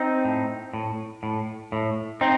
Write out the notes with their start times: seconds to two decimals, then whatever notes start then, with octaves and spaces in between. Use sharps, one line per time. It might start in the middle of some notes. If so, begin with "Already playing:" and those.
Already playing: C4 D#4
0.25 A2
0.74 A2
1.23 A2
1.72 A2
2.21 C4 D#4